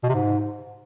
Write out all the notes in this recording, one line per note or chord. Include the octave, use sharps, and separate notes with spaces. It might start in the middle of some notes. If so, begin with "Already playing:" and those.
B2
C3
G#2